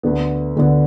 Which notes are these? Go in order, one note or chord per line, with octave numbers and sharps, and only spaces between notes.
D2 D3 B3
D2 D3 B3